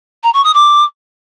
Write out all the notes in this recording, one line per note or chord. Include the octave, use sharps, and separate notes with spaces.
A#5
C#6
D#6
D6